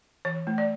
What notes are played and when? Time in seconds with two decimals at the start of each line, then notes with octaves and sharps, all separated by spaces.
0.25 E3 C#5
0.47 A3
0.58 D5